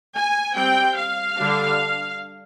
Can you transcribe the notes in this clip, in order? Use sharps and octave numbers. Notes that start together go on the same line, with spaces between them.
G#5
G3 C4 G5
F5
D3 G3 D4